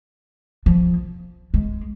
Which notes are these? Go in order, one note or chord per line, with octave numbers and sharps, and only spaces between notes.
F3
G#3